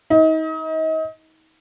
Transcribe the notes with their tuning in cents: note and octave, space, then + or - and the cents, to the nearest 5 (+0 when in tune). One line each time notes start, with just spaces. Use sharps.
D#4 +35